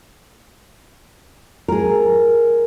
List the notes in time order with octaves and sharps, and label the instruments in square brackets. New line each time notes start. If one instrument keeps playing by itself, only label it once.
[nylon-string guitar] G#4 A#4